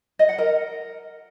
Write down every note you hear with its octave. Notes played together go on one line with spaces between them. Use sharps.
D#5
F#5
A#4